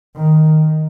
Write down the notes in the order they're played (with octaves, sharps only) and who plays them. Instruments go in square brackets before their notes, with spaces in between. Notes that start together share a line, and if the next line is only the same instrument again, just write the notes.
[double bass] D#3